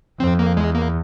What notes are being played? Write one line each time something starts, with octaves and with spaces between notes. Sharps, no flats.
F2 C4
A#3
E2 G#3
A#3